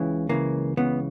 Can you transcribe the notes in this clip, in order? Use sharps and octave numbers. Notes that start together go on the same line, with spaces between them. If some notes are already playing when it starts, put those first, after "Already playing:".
Already playing: C#2 C#3 E3
C#2 C#3 E3 A#3
C#2 C#3 E3 B3